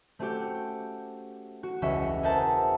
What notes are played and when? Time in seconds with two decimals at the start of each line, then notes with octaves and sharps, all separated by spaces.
0.19 A3 C4 C#4 F#4 G4
1.63 F#4
1.82 E1 C#2 C#4 E5 C#6 C#7
2.23 G#4 A#4 C5 E5 F#5 A5